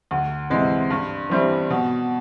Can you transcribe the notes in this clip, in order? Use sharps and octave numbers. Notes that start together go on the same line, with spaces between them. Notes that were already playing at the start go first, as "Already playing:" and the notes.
D2
C3 E3 G#3
G2
E3 G3 C4 E4
B2